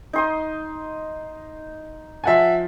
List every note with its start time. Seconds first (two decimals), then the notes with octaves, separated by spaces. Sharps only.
0.13 D#4 C6 D#6
2.24 F3 E5 F#5 G#5 A5